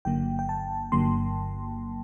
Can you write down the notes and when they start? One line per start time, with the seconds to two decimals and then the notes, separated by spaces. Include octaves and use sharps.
0.05 G1 G2 D3 F#3 A#3 G5
0.39 G5
0.49 A5
0.92 G1 G2 D3 F#3 A#3 C6